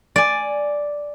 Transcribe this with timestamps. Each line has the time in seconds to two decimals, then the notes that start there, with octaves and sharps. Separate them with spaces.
0.16 D5 G#5